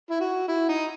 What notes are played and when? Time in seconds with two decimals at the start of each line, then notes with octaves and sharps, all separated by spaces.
0.11 E4
0.20 F#4
0.48 E4
0.69 D#4